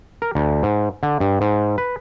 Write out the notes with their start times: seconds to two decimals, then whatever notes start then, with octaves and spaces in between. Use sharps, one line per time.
0.22 A#4
0.35 D2
0.63 G#2
1.03 D3
1.20 G2
1.41 G#2
1.78 B4